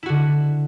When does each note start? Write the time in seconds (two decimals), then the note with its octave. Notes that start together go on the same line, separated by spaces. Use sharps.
0.03 E4
0.06 F#4
0.09 D3